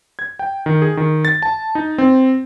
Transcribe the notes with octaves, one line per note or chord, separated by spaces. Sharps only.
G#6
G5
D#3
G#4
D#3
A6
A5
D#4
C4